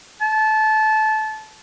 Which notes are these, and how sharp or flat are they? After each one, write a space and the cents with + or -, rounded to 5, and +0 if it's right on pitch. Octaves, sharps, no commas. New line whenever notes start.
A5 -20